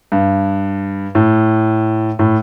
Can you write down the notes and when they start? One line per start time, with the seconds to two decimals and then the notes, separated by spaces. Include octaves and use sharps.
0.12 G2
1.15 A2
2.19 A2